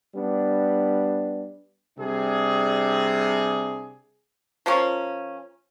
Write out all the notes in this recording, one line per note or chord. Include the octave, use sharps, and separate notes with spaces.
G3 B3 D4
C3 G3 D4 G#4
F3 A#3 C#4